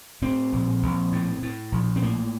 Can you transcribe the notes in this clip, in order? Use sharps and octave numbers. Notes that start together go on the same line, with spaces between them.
A2 C4
A#1
A#1
A2
A2
A#1
C4
A2 A#3